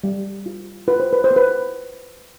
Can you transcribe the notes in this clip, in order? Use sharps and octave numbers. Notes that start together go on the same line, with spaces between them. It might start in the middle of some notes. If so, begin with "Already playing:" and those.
G3
F4
F4 B4
C5
B4
C5
B3
B4